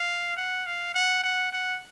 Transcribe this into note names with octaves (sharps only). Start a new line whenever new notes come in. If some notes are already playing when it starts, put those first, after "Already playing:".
Already playing: F5
F#5
F5
F#5
F#5
F#5